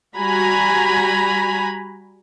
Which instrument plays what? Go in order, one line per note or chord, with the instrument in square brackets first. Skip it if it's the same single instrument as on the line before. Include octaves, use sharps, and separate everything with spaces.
[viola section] G3 F#4 G#5 A#5 B5